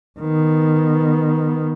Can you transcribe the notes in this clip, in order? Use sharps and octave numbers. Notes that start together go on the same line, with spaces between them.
D#3 B3